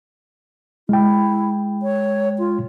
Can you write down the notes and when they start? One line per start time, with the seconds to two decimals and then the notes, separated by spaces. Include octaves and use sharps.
0.89 G#3 E4 G5
1.83 C#5
2.39 F4